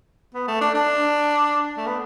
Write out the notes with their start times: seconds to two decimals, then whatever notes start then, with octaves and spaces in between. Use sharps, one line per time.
0.34 B3
0.48 A3
0.61 D4
0.74 D4
1.77 A3
1.87 B3